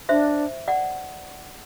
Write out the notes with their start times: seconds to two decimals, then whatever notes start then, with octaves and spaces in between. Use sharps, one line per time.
0.09 D4 C5 E5
0.68 D5 F#5